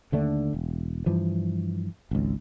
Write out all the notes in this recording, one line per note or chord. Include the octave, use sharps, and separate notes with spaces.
D#2 D3 A3 D4
E1
G2 E3 F3
G#1 C#2